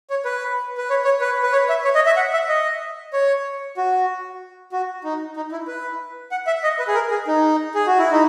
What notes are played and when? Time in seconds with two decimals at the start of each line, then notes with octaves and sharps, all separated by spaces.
0.10 C#5
0.25 B4
0.78 B4
0.90 C#5
1.05 C#5
1.21 B4
1.43 B4
1.52 C#5
1.69 E5
1.84 C#5
1.95 D#5
2.06 E5
2.16 F#5
2.33 E5
2.48 D#5
3.13 C#5
3.77 F#4
4.72 F#4
5.04 D#4
5.36 D#4
5.52 E4
5.67 B4
6.31 F#5
6.47 E5
6.64 D#5
6.79 B4
6.88 G#4
6.95 A#4
7.11 G#4
7.27 D#4
7.74 G#4
7.86 F#4
7.99 E4
8.11 D#4